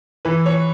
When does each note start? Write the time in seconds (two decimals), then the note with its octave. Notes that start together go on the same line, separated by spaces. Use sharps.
0.25 E3 B4
0.46 C#5